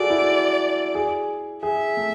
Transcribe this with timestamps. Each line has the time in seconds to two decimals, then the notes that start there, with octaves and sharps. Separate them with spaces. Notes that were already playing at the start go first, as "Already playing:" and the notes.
Already playing: F#4 G#4 A4 D5
0.10 E4
0.95 G#4
1.63 G#4 E5
1.97 A3